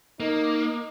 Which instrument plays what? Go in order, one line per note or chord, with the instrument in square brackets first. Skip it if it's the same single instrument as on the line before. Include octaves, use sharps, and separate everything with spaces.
[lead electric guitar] A#3 [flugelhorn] D#4